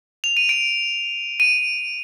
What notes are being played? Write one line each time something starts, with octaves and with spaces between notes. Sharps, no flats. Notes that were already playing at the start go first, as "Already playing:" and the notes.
F7
D#7
D7
D#7